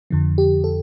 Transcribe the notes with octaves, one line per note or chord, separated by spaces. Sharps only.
F2 D3 F3
G4
A4